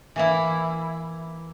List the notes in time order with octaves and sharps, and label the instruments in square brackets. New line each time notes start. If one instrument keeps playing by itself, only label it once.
[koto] E3 A#3 E4